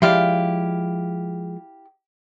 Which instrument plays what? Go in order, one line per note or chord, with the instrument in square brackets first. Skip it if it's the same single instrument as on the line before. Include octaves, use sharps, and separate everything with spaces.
[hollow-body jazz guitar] F3 G#3 D5 [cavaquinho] E4 G4 F5